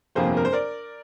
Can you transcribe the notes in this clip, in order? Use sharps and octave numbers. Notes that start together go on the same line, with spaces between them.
G1 F2 C3 F3 A#3 G#4 C5
A#4
C5
A#4 D5